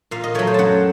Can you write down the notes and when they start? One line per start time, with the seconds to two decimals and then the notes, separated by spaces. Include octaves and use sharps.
0.11 A#2 F5
0.24 D#5
0.35 F#3 A3 C#5
0.47 C5
0.54 F#2 F#5 A5